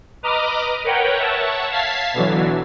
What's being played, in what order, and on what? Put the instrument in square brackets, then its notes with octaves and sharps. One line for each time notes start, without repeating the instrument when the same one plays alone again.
[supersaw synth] B4 D#5 A#5 D6 D#6 F6
A#4 B4 C#5 F#5 G5
C#5 E5 F#5 A5
F5 A5 G#6 A6 B6 C7
B2 D3 E3 F#3